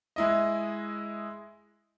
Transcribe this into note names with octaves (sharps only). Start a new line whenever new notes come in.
G#3 E4 D#5